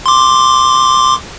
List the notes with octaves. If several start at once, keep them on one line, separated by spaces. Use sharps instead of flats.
C6 D6